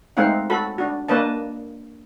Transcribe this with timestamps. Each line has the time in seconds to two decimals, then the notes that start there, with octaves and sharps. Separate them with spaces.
0.17 G#3 A3 C4 D#4 F5 F#5
0.50 F#4 A4 B5
0.78 D4 F#4
1.08 A#3 D4 B4 D#5 A5